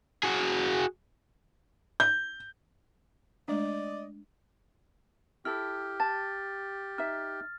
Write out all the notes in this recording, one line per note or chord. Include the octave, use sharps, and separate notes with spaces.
F#4 G#4
G6
G#3 A3 D4 D5 D#5
E4 G4 A4 F6
A5 A6
D#4 E5 F6